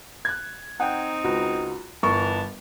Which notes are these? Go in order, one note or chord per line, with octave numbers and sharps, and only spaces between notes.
F#6 G#6
C4 D#4 F#5 G5 A#5
C#2 F#4
G1 E3 A#4 A5 C#6